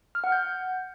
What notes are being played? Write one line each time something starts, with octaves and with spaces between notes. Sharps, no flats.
F6
F#5
G6